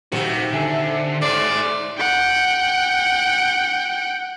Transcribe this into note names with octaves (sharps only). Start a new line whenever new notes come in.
D#1 C3 F#4 G4
D3 E5 G#5
G#2 G#4 C5 D5
F#5 G5